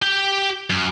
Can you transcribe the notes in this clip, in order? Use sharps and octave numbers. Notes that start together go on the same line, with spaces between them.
G4 G5
F#2